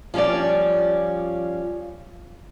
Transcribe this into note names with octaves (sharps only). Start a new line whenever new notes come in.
F3 G3 C#4 F4 D5